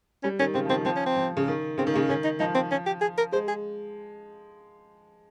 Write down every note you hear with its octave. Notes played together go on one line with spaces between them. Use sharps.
G3 C#4
D#3 C#4
C#3 C4
F3
D#3 C4
F3 C4
C#4
C4
F3
C#3
D#3
C#3 C4
D#3
C#3 A#3
D#3 C#4
D#4
F3 D#4
C4
C#4
G4
G#4
A#4
G#3 C5
G#4